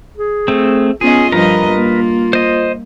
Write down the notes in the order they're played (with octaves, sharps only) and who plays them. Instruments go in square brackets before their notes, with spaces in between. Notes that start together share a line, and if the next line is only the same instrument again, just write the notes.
[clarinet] G#4
[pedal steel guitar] A3 C4
[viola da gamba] B3 C#4 D#5 [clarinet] F4 [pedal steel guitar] G#4
[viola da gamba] G2 F3 D#5 [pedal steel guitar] A#4 B4 A#5
[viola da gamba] A#3
[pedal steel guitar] C5 D#5